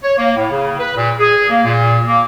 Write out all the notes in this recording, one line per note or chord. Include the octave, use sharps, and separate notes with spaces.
C#5
A#3
A2
C#3
B4
A#2
G#4
A#3
A#2
A#3